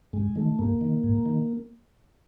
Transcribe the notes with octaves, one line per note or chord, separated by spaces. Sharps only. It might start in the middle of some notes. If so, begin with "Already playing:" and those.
G2 G#3
D#3 A3
G2 A#3
D#3
G#2
D#3